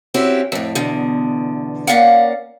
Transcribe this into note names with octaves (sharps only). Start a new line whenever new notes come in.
C4 C#4 E4 F#4 G4
F2 A2
E2 B2 D3
A#3 C4 C#4 D5 F5 F#5